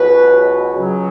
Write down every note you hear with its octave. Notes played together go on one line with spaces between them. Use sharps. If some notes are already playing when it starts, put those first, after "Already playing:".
Already playing: C#2 B2 F#3 B4
C#2 C#3 F#3